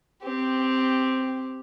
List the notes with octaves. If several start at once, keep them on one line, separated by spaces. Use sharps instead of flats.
C4 G4